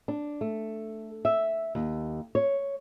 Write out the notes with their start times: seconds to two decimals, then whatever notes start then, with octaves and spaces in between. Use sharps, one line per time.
0.08 D4
0.41 A3
1.25 E5
1.75 D#2
2.35 C#5